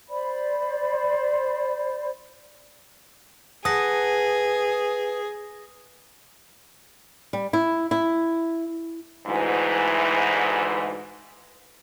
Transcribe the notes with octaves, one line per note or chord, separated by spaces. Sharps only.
C5 D5 B5
G#4 B4 F#5 A5 D#6 A#6
G3
E4
E4
D2 G#2 E3